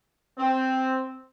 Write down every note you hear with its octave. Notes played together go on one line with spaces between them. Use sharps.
C4